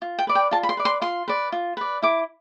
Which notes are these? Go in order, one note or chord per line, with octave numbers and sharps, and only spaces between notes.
F4
G5
B4 D5
G5
F4 A5
B5
C6
B4 D5
C6
F4 C6
B4 D5
F4
B4 D5
E4 D6